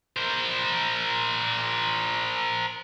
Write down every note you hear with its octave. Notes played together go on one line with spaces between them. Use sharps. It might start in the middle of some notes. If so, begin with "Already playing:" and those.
A#4 C5